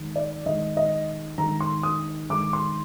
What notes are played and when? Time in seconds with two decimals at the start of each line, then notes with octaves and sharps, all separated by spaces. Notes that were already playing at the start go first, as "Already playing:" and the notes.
Already playing: D#3 G#3
0.16 D5
0.46 D#3 G#3 D#5
0.77 D#5
1.38 D#3 G#3 A#5
1.61 C6
1.83 D#6
2.30 D#3 G#3 D6
2.53 C6